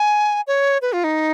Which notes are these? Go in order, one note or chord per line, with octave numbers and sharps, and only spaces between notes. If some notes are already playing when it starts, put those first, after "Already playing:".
Already playing: G#5
C#5
B4
F4
D#4